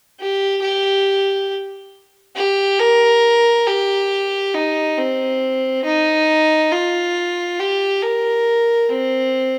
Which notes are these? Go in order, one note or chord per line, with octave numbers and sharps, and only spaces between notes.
G4
G4
G4
A#4
G4
D#4
C4
D#4
F4
G4
A#4
C4